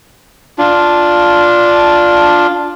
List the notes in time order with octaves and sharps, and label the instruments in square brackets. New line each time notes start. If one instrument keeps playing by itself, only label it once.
[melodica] D4 F4